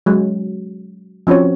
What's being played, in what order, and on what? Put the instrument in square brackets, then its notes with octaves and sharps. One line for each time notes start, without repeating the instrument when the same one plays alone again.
[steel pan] F#3 G#3
F3 C4 C#4 F#4 C#5